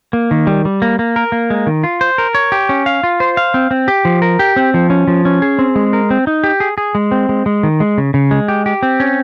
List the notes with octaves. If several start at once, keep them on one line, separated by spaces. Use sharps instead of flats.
A#3
D#3
G3
G3
A#3
A#3
A#4
A#3
G#3
D#3
F4
C5
A#4
C#5
G4
C#4
F5
F4
C5
F5
C4
C4
G4
F3
A#4
G4
C4
F3
C#4
F3
C#4
G#4
C4
G#3
A#4
C4
D#4
G4
G#4
G#4
G#3
C4
G#3
G#3
D#3
G#3
C#3
C#3
G#3
G4
G4
C4
C#4